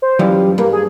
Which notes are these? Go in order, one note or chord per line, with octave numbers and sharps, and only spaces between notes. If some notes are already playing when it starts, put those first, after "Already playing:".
C5
F#2 E3 F3 G3
G2 A#3
G#4